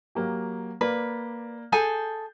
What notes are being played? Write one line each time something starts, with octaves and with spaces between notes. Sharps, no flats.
F#3 A#3 G4
A#3 B4 D5
G#4 A4 G#5 G6